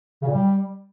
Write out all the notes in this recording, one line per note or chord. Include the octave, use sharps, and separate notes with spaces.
C#3
A#2
G3